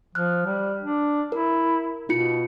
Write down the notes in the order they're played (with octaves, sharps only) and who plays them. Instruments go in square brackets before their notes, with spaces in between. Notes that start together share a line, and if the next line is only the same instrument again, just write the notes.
[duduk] F3 [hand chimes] F6 F#6
[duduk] G3
D4
[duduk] E4 [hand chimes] A#4
[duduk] B2 [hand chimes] D#4 F4 C#7